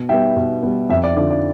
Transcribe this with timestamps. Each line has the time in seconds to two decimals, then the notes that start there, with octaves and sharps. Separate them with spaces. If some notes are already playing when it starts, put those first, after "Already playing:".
Already playing: B2
0.09 G3 B3 E5 G5
0.36 B2
0.63 G3 B3
0.90 F2 E5
1.04 D5
1.16 D3 D5
1.21 F3
1.31 D5